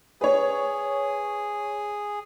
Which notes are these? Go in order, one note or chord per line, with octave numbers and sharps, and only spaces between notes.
G#4 B4 C#5